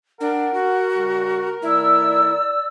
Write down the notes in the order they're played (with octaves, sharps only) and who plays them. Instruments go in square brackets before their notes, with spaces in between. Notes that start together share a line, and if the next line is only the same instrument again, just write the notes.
[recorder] D4 [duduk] A#4 [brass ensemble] F#5
[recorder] F#4
[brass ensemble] C#3 G3
[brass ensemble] D#3 A3 [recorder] E4 [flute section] D5 E6